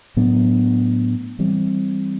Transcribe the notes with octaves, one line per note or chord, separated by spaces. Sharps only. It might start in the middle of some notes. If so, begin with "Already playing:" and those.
A2 F#3 B3 D4
E3 G3 C4